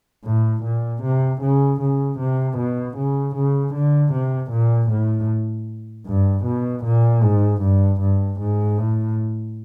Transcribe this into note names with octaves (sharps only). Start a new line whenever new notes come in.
A2
A#2
C3
C#3
C#3
C3
B2
C#3
C#3
D3
C3
A#2
A2
G2
B2
A#2
G#2
G2
G2
G#2
A2